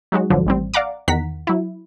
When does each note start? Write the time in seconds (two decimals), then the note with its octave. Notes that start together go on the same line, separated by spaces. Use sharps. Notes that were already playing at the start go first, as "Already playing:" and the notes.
0.12 F#3 G#3 D#4 F#4
0.30 G#1 F2 D3 F3 F#3
0.46 A1 G3 C4
0.74 D5 F5 F#5 A#5 D6
1.08 E2 D#3 F#5 A#5 B6
1.47 F#3 E4